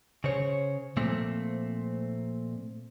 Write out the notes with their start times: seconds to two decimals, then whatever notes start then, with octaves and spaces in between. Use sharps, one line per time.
0.24 C#3 C5 C#5
0.97 A#2 F3 A3 C4